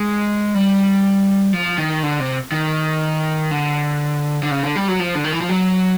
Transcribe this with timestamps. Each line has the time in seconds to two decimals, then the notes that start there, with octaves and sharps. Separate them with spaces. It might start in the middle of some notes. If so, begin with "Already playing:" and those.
Already playing: G#3
0.54 G3
1.53 F3
1.78 D#3
2.03 D3
2.20 C3
2.52 D#3
3.51 D3
4.43 D3
4.51 C#3
4.63 D3
4.76 G3
4.88 F#3
4.99 F3
5.15 D3
5.24 D#3
5.32 E3
5.41 F3
5.49 F#3